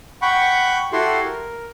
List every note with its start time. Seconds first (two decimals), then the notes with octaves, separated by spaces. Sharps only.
0.22 F#5 G5 B5 C#6
0.93 E4 F#4 G4 A4 C6
1.25 A#4